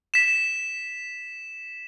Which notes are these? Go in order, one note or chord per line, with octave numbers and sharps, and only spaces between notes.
B6 E7